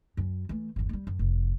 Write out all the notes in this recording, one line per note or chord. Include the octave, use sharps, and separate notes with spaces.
F#2 F#3
E3 A3
G1 E2
G3 G#3
F#2
F1